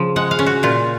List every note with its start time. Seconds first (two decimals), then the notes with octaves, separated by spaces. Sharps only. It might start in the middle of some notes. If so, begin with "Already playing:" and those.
Already playing: C#3 F3
0.16 G#3 F#5
0.31 F5
0.39 C#4
0.46 F#4
0.63 A#2 F4